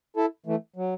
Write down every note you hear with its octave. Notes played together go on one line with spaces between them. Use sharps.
E4 A4
E3 A3
F#3